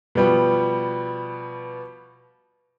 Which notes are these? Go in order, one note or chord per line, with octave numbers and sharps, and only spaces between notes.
B2 F3 G3 B3